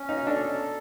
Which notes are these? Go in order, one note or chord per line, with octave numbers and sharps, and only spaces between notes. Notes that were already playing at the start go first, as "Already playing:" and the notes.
Already playing: C#4
D#4
D4 A4